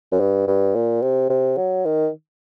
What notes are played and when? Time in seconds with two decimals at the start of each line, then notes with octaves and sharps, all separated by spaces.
0.12 F#2
0.20 G2
0.47 G2
0.75 A#2
1.02 C3
1.30 C3
1.57 F#3
1.85 D#3